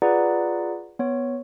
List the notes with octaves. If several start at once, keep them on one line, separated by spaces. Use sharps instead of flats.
F4 G#4 B4 D5 F#5 A#5
B3 C#5